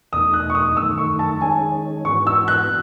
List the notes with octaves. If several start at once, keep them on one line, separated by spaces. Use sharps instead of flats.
E2 B2 A3 D#4 D#6
F#6
C#6
D#6
F#2 D#3 A3 E6
C#6
A5
D#3 G#3 C#4 G#5
G#2 E3 B3 F#4 C#6
E6
F#6